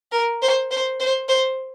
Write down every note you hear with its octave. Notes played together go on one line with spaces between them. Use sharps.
A#4
C5
C5
C5
C5